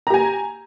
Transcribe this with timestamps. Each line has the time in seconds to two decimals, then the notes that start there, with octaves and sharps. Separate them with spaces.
0.07 A#5
0.10 G4
0.14 G#5